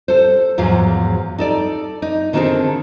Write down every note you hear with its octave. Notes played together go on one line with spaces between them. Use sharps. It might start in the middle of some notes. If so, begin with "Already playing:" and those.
A4 C5
E2 G#2 F3 F#3 F5
D#4 A4 D5
D#4
D3 D#3 B3 C4 G#4 A4